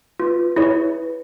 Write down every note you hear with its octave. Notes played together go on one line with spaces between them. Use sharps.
F4 B4
E4 G#4 C#5